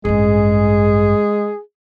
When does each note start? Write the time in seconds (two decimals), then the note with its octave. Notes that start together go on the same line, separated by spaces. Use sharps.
0.05 A1 G2 G#3 G#4